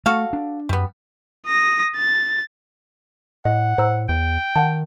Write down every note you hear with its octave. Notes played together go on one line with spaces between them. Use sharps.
A3 F#4 A4 F5
D4
F#2 G3 B3
D#6 A#6
A6
A2 D#5 F#5
A2 C5 A#5 E6
E2 G5
D#3 F#5 A5